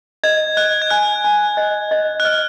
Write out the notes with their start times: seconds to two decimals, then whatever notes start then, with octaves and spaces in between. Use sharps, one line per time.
0.23 D#5 G#6
0.57 D#5 F#6
0.82 G#6
0.90 G#5 F#6
1.24 G#5
1.57 D#5
1.91 D#5
2.20 F#6
2.25 D#5 F6